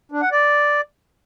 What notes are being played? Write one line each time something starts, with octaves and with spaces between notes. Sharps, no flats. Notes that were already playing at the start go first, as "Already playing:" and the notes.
D4
F#5
D5